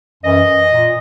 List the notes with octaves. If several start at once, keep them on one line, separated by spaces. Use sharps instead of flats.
F#2 E3 D#5
A#2